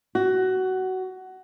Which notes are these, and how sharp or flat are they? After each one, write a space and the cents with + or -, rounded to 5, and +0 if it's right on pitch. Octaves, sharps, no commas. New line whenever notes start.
F#4 +15